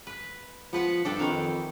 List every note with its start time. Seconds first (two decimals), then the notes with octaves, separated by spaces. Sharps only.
0.07 B4
0.73 F3 B3 B4 F#5
1.05 G2 D4 A4 G5
1.19 F2 D#3 E3